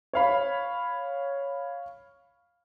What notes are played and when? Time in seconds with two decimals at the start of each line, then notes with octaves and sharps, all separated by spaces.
0.13 C#5 F5 B5